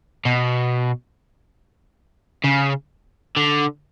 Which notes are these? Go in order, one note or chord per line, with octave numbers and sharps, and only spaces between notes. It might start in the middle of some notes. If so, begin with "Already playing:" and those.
B2
C#3
D3